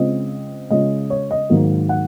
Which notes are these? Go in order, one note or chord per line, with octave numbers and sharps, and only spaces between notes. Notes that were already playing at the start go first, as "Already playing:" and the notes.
Already playing: C#3 G#3 C4 F4 D#5
C#3 G#3 C#4 F4 D#5
C#5
D#5
G#2 D#3 F#3 A#3
F#5